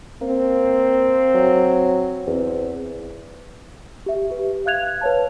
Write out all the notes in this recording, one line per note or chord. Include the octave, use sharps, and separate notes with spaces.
A#3 C4
F#3
E2 C4
G4 E5
G4 B4
E5 F5 F#6 G#6 F7
B4 C#5 A5